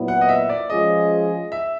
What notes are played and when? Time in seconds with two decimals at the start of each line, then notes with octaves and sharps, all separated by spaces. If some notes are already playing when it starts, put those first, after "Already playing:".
Already playing: A#2 F#3 B3 E4
0.08 F#5
0.21 D#5
0.29 E5
0.49 D5
0.70 F3 G#3 C#4 F4 G#4 D#5
1.52 E5